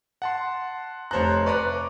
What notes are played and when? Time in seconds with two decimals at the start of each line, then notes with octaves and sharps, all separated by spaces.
0.22 F#5 A5 C6
1.11 F1 C5 C#5 A5 A#5 F#6
1.46 B4 D5 A#5 C#6 D6 F#6